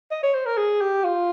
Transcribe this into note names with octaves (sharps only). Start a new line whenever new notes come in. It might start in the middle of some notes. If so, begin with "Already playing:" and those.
D#5
C#5
C5
A#4
G#4
G4
F4